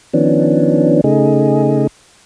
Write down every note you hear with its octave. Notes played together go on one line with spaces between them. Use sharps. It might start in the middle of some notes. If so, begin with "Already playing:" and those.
D#3 F3 B3 C#4 D4
C#3 A3 D#4 G#4